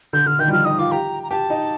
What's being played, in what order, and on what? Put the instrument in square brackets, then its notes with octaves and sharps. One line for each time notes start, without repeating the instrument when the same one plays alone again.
[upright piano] D3 [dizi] G6
[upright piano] D3 [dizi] F6
[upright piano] D#3 [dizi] G6
[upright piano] G3
[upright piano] F3 [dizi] F6
[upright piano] D#4 [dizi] D#6
[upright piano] F4 [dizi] D6
[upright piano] G4 [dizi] A#5
[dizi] A#5
[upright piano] G4 [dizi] A5
[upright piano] D#4